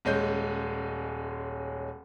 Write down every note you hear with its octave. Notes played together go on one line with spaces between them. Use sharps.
D#1 G#3 C#4 G6